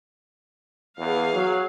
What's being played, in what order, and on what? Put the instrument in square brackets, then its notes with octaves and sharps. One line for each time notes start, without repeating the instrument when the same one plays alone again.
[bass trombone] E2 [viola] G#4 F5
[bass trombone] F#3